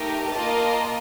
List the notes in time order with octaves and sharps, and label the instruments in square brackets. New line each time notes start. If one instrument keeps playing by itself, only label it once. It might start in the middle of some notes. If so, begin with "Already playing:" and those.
Already playing: [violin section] A3 D#4 G4 A#4
A#3 F4 A#4 D#5 A5